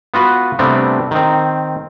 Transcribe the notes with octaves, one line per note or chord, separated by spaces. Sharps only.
B3 F4 F#4 B4
C3 G3 A3 B3 C4 D4
D#3 C4